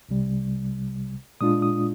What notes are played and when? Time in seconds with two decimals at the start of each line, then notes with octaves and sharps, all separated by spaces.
0.09 C2 C3 G3
1.41 A#2 G#3 D4 F4 D#6
1.62 D#6